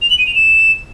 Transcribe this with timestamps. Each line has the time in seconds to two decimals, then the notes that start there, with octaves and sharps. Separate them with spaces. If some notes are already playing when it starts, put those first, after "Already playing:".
0.02 F7
0.10 F#7
0.18 D#7
0.27 F7
0.35 E7